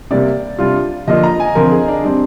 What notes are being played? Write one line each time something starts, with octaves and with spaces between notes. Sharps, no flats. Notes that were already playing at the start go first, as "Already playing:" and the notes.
C3 G3 A#3 D5
C3 G3 D4 F4
D3 F3 A#3 D4 F4 D#5
A#5
G#5
D3 F3 C4 A#4
G#4
D4
G3 C4 D4